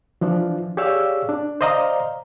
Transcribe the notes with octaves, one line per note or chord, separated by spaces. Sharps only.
E3 F3 D4
G4 G#4 C#5 D5 F5 E6
D4
C5 D5 D#5 F5 A#5